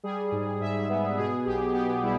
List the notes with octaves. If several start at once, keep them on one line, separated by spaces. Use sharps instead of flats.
G3 G#4
G#2
G#2 E5
B3
B2 G#4
B1 G4
B3 G4
G3 E4